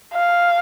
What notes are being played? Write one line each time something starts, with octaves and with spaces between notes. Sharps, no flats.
F5